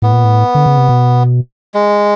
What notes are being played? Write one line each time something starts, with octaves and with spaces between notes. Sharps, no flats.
A2 B3
A#2
A2
D3
C#3
C3
B2
G#3